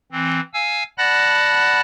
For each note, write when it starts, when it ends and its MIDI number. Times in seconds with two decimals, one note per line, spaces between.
0.12 0.40 52
0.12 0.40 60
0.54 0.83 77
0.54 0.83 80
0.54 0.83 88
0.98 1.81 74
0.98 1.81 78
0.98 1.81 81
0.98 1.81 83
0.98 1.81 90
0.98 1.81 94